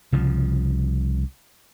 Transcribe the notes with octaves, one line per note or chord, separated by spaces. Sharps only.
C2 C#3 F3